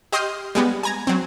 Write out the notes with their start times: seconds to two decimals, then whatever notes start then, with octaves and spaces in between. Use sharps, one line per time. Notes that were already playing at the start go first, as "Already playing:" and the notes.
0.12 G4 D#5 C6 D#6 F6 G6
0.55 G3 G#3 B3
0.83 G#5 A#5 G#6
1.07 F#3 C4